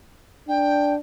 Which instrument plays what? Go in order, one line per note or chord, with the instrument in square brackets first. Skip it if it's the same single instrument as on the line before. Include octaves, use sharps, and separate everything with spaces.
[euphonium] D4 [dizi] G5